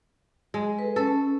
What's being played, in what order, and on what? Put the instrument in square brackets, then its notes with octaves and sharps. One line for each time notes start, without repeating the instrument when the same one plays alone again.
[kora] G#3
[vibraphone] A4 B4
[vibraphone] C#4 [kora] A4